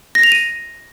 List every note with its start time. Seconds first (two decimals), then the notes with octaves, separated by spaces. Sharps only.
0.15 A#6
0.23 F7
0.32 D#7